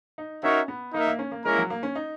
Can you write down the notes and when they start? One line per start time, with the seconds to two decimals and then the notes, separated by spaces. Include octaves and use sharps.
0.18 D#4
0.43 C#4 D#4 F#4 A#4 C#5 E5
0.68 B3
0.94 A#3 D#4 A#4 E5
1.07 A#3
1.19 C#4
1.32 A#3
1.45 G#3 A#3 C#4 E4 A#4
1.58 F#3
1.70 A#3
1.83 C#4
1.95 D#4